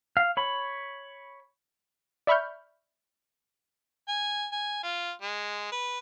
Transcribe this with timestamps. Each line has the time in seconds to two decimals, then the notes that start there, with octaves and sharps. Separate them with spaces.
0.17 F5
0.37 C#5 B5
2.27 D5 E5 B5 C#6 F6 G6
4.08 G#5
4.52 G#5
4.83 F4
5.22 G#3
5.72 B4